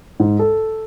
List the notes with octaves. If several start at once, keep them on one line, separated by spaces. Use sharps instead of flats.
G#2
A4